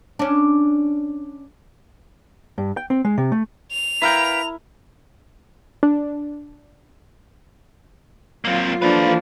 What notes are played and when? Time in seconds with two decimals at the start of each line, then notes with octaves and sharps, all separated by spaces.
0.19 C#4 D4
2.58 G2
2.77 G5
2.90 C4
3.05 G#3
3.18 C3
3.32 A3
3.72 F7
4.02 E4 A#4 B4 F5 G5 A#5
5.83 D4
8.45 F#3 A#3 C4 F4
8.82 E3 F3 A#3 D4 A4 B4